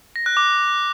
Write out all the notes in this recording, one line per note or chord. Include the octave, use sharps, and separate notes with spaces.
A#6
F#6
D6